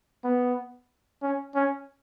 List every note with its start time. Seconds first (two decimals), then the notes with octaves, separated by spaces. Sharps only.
0.24 B3
1.22 C#4
1.55 C#4